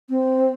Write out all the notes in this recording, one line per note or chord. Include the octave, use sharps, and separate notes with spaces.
C4